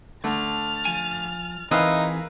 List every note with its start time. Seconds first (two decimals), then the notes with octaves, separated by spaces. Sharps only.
0.24 D3 A3 F6 A6
0.85 F3 G#5
1.71 E3 A#3 C4 D#4 G#4 B4 E5 F5